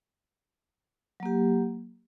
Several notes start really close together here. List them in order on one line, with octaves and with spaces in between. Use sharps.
F#3 A#3 G4